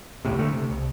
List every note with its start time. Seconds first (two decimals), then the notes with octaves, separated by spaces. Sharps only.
0.25 F1 C#2 A2 C3
0.39 D3 A3
0.53 C3
0.71 C2